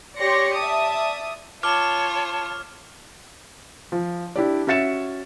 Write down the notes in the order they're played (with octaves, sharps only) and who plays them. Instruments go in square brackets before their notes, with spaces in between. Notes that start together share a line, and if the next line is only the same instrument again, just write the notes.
[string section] G4 C#5 D5 C6 A#6 C#7
D5 E5 A5 D#6
[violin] F4 C#5 [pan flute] A5 [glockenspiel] D6 G7 [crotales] F6
[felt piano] F3
D4 E4 G4 D5
C#4 F#4 E5 A6 C#7 E7